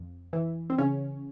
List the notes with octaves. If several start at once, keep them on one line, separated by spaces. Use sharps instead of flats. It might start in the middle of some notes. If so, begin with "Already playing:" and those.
Already playing: F2
E3
C4
C#3 C#4